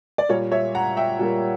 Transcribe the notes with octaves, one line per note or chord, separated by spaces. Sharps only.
D5
A#2 G3 A#3 A#4 C#5
C#5 E5
F#5 A#5
E5 G5
A#2 G3 A#3